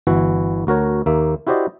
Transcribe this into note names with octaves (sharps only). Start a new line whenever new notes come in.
G1 E3 E4 F#4
D2 F#4 A#4 C#5
D#2 A#3 E5
E4 F#4 G4 C5 D5 D#5